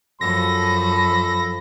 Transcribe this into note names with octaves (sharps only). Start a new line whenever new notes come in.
F#2 F3 A4 B5 A#6